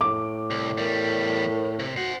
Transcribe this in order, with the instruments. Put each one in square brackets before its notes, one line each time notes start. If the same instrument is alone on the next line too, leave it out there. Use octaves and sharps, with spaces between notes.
[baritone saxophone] A2 [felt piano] D6
[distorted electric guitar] C2
[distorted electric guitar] E2 G3 [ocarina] A#4
[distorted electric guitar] C3
[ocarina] F#4 [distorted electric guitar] C5 F#5